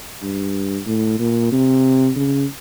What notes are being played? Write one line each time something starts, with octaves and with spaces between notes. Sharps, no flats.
G2
A2
A#2
C3
C#3